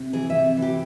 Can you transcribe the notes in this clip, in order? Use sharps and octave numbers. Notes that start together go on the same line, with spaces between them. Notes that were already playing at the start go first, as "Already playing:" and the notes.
Already playing: C3
E3 G#4
E5
C3
E3
G4